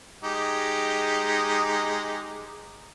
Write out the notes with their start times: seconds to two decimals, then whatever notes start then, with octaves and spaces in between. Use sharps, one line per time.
0.24 G#3 D#4 G4